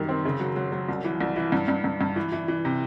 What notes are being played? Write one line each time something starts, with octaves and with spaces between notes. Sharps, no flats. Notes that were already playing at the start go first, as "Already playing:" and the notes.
Already playing: F#2 D#3 G3
C4
C#3
F#3
F#3
F#3
C2
E3
C2
E3
G2
G2
G2
G2
E3
E3
E3
C3